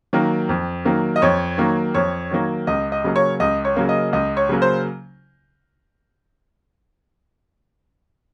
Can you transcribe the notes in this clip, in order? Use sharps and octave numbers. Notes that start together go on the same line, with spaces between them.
D#3 F#3 A#3
F2
D#3 F#3 A#3
D#5
F2 C#5
D#3 F#3 A#3
F2 C#5
D#3 F#3 A#3
C#2 D#5
D#5
C#3 F#3 A#3
C#5
C#2 D#5
C#5
C#3 F#3 A#3
D#5
C#2 D#5
C#5
C#3 F#3 A#3
C5